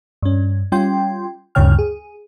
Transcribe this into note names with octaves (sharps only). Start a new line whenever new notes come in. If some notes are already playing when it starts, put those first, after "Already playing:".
G2 C#4
G3 C#4 F4 G5 C6
D2 G2 C#3 C#5 G5 F6
G#4